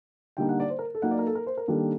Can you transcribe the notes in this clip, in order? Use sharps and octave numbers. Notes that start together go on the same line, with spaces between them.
D3 G3 A#3 D#4 G5
F#5
D5
C5
A#4
A4
F#3 A#3 D#4 F#5
D5
A#4
A4
A#4
C5
A#4
D#3 G3 A#3 D4 A4